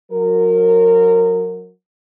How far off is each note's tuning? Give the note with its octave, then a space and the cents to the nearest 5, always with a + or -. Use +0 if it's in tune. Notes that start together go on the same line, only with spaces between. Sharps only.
F#3 -30 A#4 -20